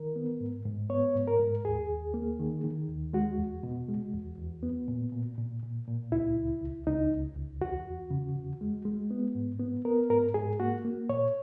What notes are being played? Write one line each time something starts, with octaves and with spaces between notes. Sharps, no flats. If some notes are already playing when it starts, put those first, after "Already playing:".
Already playing: D#3 A#4
B3
G#2
G#2
B3 C#5
G#2
A#4
G#2
D#2 G#4
D#2
A#3
D#3
D#3
D#2
G#3 F#4
E2
B2
G#3
E2
E2
B3
A#2
A#2
A#2
A#2
A#2
C#2 E4
C#2
C#2
C#2 D#4
C#2
C#2
E2 F#4
E2
C#3
E2
G#3
G#3
B3
G#2
B3
B3 A#4
G#2 A#4
G#2 G#4
A#3 F#4
A#3
A#2 C#5